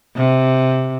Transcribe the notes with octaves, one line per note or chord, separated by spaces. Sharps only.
C3